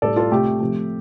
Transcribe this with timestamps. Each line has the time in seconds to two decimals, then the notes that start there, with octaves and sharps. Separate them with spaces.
0.02 A2 G3 A4 D5
0.16 F4 A4
0.31 C3 A3 G4
0.60 C3 F3 A3